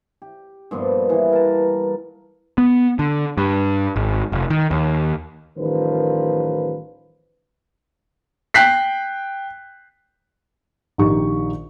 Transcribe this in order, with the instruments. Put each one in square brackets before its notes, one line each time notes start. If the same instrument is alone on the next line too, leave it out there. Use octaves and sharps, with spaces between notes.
[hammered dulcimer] G4
G2 A#2 F3 B3
E3
A#4 A5
[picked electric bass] B3
D3
G2
G#1
F1
D#3
D#2
[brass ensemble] A1 D#3 F3 G3 A#4 B4
[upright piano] G5 F#6 B6 C7
[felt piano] A#1 D#3 D#4 G4 C#6